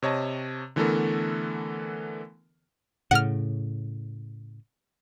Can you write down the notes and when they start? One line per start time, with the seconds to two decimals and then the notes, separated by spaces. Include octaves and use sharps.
0.02 C3 C#5 D#5 A5
0.76 D3 E3 A3 B3 A4 A#4
3.11 A2 C#3 F#5 F6